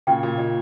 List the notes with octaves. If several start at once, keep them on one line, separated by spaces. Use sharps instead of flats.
A#2 C#3 G5
A#2
A#2 D#5